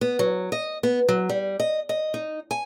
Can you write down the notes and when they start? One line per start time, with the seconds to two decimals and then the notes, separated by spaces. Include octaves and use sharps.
0.01 B3
0.19 F#3
0.52 D#5
0.83 B3
1.09 F#3
1.29 G3
1.60 D#5
1.89 D#5
2.14 D#4
2.51 G#5